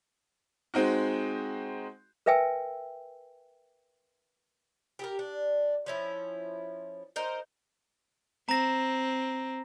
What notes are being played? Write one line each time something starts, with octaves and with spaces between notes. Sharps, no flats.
G#3 C4 D#4 F#4
A#4 B4 E5 G5 G#5 E6
G4 G#4 A#4
D4
F3 C#4 E4
D#4 A#4 C5
C4 A#5 A#6